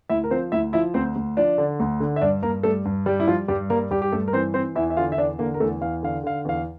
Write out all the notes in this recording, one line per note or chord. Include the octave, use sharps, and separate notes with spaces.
D2 E4 E5
A#4
F3 C4 C5
D2 E4 E5
F3 E4 E5
D2 C4 C5
D2
F3 D4 D5
D3
D2
D3
E5
G2 D4 D5
G2 A#3 A#4
G3 A3 A4
G2
G3 G4
E4
F3 G3 F4
G2 G3 G4
G3 A#3 A#4
G2 G3 G4
G4
G2 A3 A4
A#4
E3 C4 C5
E3 C4 C5
E2 E4 E5
E5
D3 F4 F5
E5
E2 D4 D5
D3 A#3 A#4
A#4
E2 A3 A4
E2 F5
D3 F5
D3 F5
E2 F5